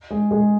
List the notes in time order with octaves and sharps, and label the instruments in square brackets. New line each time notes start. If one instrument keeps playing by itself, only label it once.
[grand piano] G#3 G#4
G#3 G#4